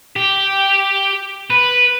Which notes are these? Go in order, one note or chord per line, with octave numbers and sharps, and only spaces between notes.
G4
B4